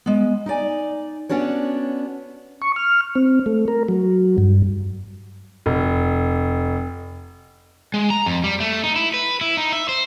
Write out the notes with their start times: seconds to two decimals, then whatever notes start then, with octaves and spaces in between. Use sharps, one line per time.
0.06 G#3 B3
0.46 D#4 E4 D5 G#5
1.29 B3 C#4 D4 F#4 C#5
2.62 C#6
2.76 F6
3.15 C4
3.46 A3
3.68 A#4
3.88 F#3
4.38 G2
5.66 F1
7.94 G#3
8.10 A#5
8.26 F2
8.44 G3
8.60 A3
8.83 D#4
8.96 E4
9.14 B4
9.41 E4
9.57 D#4
9.73 E5
9.89 C5